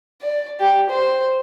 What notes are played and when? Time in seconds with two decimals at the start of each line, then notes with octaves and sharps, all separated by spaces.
0.22 D5
0.60 G4
0.90 C5